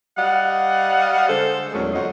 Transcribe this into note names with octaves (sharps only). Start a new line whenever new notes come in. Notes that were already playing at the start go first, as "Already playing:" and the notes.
G3 D#5 F5 F#5
D3 G#3 A4 C5
E2 A#2 F#3 G#3 A3 C#4
F2 D3 F#3 F4 D#5 F#5